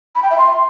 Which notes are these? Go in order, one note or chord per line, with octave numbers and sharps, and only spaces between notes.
B5
G5
E5
C6